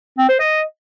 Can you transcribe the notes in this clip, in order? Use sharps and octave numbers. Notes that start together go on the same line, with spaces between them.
C4
C5
D#5